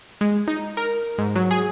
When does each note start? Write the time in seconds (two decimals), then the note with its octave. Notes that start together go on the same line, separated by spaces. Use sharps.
0.21 G#3
0.48 D#4
0.77 A#4
1.18 G#2
1.35 F#3
1.51 G#4